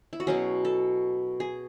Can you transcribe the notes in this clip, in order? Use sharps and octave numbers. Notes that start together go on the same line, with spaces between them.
E4
F#4
B2 F#3 C#4 G#4
A4
G#4